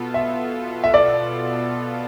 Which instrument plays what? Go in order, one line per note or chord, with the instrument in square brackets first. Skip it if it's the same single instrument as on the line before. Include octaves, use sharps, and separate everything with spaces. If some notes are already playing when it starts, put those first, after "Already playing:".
Already playing: [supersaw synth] B2 B3 F4 A4
[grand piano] E5
E5
D5